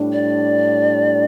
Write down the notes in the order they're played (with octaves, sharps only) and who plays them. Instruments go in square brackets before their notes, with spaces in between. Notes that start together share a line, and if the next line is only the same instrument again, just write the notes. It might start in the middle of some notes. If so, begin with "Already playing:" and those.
Already playing: [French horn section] A2 G3 D4
[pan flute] D5